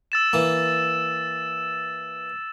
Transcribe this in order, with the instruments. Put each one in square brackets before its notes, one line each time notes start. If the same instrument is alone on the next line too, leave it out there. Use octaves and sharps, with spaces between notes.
[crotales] E6 A6 E7
[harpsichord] E3 A#3